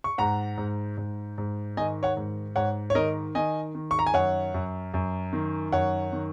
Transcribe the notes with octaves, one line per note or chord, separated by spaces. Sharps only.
C#6
G#2 F#5 A#5
G#2
G#2
G#2
D#3 D#5 G#5
C#5 F#5
G#2
G#2 C#5 F#5
C#5
D#3 A#4 D#5
D#3 D#5 G#5
D#3
C#6
A#5
G#5
F#2 C#5 F#5
F#2
F#2
D#3
F#2 C#5 F#5
D#3